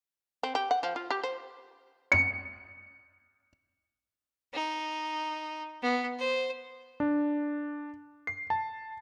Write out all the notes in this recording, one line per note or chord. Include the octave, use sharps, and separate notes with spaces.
C4
G4
F#5
F3
F4
G4
C5
C#7
D#4
B3
C5
D4
C7
A5